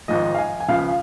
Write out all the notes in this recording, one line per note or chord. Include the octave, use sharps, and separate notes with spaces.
G#1 G#2 F3 D#5
F5
G#5
G#5
C#2 C#3 F3 F5